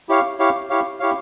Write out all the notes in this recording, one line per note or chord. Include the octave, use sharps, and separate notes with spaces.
E4 G4 C#5 F5
E4 G4 C#5 F5
E4 G4 C#5 F5
E4 G4 C#5 F5